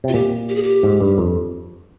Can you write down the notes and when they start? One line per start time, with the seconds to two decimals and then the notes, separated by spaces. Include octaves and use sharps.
0.04 C3 F4
0.14 A#2 G4
0.49 G4
0.56 G#4
0.63 G4
0.83 G#2
1.00 G2
1.18 F2